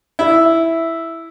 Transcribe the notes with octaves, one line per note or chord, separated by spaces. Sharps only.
E4